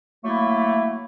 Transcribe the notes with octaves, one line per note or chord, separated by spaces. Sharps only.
F#3 A3 A#3 E4